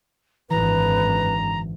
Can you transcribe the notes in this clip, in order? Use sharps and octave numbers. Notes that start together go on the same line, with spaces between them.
G#1 F#2 D3 E3 B4 A#5 A#6